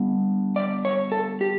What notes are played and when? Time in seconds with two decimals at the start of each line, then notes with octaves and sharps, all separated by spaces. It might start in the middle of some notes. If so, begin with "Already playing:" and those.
Already playing: D3 G3 B3
0.56 D5
0.85 C#5
1.12 A4
1.41 G4